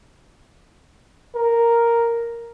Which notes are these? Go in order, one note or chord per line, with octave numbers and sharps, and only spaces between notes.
A#4